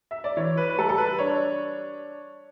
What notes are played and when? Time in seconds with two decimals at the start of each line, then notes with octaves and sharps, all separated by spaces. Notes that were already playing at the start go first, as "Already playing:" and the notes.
0.11 E5
0.24 D5
0.37 E3 C#5
0.57 B4
0.70 B4
0.78 G3 A4
0.89 A4
0.98 B4
1.19 D4 C#5